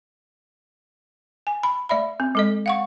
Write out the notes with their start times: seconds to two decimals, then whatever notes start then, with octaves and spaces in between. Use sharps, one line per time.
1.47 G#5
1.63 B5
1.89 A3 D5 E5 B5
2.20 C4
2.35 G#3 A4 D#5
2.66 F5 F#5 C#6